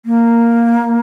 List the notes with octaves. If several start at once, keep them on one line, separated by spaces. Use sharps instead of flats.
A#3